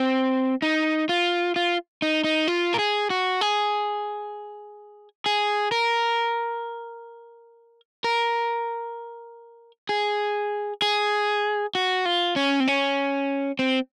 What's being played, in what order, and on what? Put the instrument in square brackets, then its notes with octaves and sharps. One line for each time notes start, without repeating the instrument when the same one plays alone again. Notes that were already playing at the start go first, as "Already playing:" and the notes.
Already playing: [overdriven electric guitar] C4
D#4
F4
F4
D#4
D#4
F4
A#4
G#4
F#4
G#4
G#4
A#4
A#4
G#4
G#4
F#4
F4
C#4
C4
C#4
C4